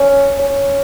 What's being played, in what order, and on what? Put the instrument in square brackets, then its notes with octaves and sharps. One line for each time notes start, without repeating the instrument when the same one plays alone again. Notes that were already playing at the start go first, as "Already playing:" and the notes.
Already playing: [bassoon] C#4
C#4